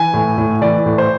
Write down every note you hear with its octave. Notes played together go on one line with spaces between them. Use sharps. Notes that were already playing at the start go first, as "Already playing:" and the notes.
Already playing: E3 G#5
A2
A2
E3 D5
A2
C5